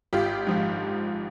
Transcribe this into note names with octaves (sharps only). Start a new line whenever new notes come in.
G#1 F4 G4
G#2 F3